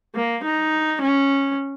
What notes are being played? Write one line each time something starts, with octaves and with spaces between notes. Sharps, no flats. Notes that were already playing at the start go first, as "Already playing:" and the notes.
A#3
D#4
C#4